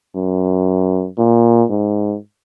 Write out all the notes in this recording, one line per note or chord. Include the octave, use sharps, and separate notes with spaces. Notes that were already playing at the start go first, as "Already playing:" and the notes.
F#2
A#2
G#2